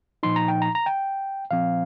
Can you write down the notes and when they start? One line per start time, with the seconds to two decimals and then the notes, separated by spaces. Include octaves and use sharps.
0.23 A#2 F3 D#4 C6
0.36 A#5
0.48 G5
0.62 A#5
0.75 A#5
0.86 G5
1.51 A#2 F3 C4 F5